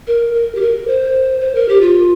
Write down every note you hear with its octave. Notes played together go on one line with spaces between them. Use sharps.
A#4
A#4
G4
A#4
C5
C5
A#4
G4
F4